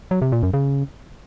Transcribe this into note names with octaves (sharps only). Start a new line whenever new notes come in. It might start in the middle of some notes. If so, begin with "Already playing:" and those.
F#3
C3
A#2
F#2
C#3